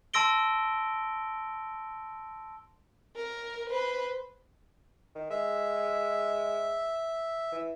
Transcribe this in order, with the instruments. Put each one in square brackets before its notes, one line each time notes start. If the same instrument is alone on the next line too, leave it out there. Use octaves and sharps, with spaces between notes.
[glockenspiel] A5 C6 E6 A#6 D7 G7
[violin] A#4
B4 C5
[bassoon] D#3
[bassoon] G#3 [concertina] E5
[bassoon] E3